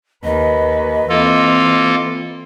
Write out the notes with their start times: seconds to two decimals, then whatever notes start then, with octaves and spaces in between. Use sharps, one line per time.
0.24 D#2 B4 D#5
1.09 E3 A#3 C4 F4 A4